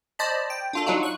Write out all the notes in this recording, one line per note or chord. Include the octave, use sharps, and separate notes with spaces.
C5 D5 D#5 A5 B5
G5
D4 F4 A4
F#3 D4 D#4 F4 F#4
C#6 F#6